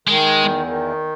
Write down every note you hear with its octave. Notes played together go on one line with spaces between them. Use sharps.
D#3 G#3
E2
D#3